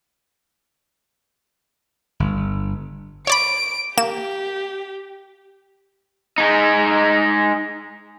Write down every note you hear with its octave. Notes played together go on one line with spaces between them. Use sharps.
G1
C#5 D5 B5 D7
A#3 G4 E7
G#3 D#4